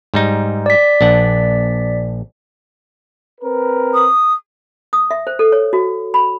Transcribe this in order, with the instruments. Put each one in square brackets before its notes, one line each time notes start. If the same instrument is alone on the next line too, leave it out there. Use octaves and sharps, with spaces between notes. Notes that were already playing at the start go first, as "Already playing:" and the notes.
[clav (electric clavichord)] G#2 G3 D#4
[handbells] D5 B6
[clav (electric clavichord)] A#1 D4 F#5
[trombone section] C4 A#4 B4
[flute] D#6
[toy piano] D#6
E5
C5
A4
C#5
F#4
B5